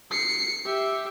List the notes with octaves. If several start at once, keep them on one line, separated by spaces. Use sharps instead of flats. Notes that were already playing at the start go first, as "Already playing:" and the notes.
C7 C#7
G4 E5